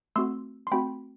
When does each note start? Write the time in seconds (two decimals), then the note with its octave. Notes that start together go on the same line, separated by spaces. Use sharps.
0.16 A3 C4 F#4 C6 E6
0.67 C6
0.71 A3 C4 F#4 G5 B5